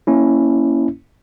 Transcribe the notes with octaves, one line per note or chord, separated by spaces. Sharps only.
A#3 C#4 E4